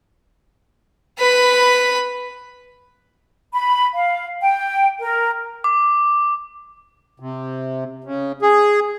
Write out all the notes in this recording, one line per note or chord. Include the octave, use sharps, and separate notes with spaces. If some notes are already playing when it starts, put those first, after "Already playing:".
B4 B5
B5
F5
G5
A#4
D6
C3
C#3
G#4